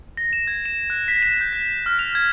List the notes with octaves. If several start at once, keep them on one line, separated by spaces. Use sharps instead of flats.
A#6
E7
G#6
E7
F#6
B6
E7
G6
B6
F6
F7
G#6